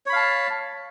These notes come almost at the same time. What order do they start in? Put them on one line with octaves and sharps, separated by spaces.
C#5 B5 F5 A5